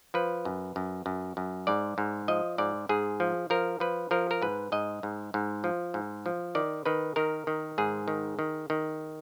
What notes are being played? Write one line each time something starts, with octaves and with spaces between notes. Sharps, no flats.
F3 B4
F#2
F#2
F#2
F#2
G#2 D5
G#2
F3 D#5
G#2 D5
G#2 G#4
F3
F3 A#4
F3 B4
F3 A#4
A#4
G#2 B4
G#2 D#5
G#2
G#2
F3
G#2
F3
D#3 D5
D#3 B4
D#3 A#4
D#3
G#2 G#4
D#3
D#3
D#3